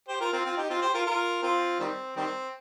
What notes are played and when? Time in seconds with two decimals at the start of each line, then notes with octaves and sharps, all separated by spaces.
0.08 G4 C5
0.21 F4 A#4
0.33 C4 F4
0.45 C4 F4
0.57 D#4 G4
0.70 C4 F4
0.82 G4 C5
0.94 F4 A#4
1.07 F4 A#4
1.43 C4 F4
1.80 D#3 G3 C4
2.17 D#3 G3 C4